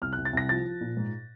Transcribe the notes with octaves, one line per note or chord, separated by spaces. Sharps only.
C2 F6
C2 F#6
A6
C2 A#6
F3 A6
F3
A#2
G#2